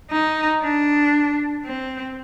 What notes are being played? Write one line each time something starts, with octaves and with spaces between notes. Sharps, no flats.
D#4
D4
C4